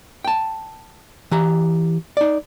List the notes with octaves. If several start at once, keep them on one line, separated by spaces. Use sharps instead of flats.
G5 A5
E3 G4 A#5
D#4 D5